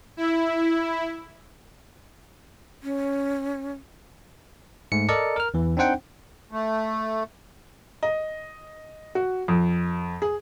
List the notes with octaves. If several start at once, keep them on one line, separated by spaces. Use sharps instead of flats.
E4
C#4
G#2 A3 C#7
A4 A#4 D5 D#5 A#5 C#7
A#4 F6
E2 E3
C4 D4 D#4 C5 F#5 G5
A3
D#5
F#4
F2
G#4